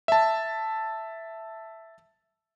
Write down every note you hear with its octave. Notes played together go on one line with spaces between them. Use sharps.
E5 A5